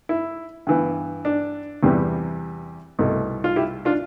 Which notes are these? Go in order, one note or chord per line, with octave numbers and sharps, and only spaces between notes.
E4
G2 E3 B3
D4
E2 C3 G3 B3
C2 B2 A3
F4
E4 G4
D4 F4